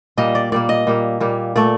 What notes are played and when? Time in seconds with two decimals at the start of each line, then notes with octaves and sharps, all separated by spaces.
0.17 A#2 G3 A#3 D#5
0.35 D5
0.52 A#2 G3 A#3 D5
0.69 D#5
0.87 A#2 G3 A#3
1.20 A#2 G3 A#3
1.56 A#2 A3 D5